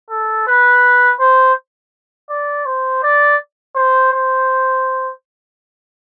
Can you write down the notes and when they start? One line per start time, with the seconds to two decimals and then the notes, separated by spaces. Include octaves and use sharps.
0.10 A4
0.47 B4
1.19 C5
2.29 D5
2.66 C5
3.03 D5
3.75 C5
4.12 C5